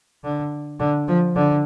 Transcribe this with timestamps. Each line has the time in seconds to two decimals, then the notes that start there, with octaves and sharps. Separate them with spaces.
0.24 D3
0.80 D3
1.08 F3
1.36 D3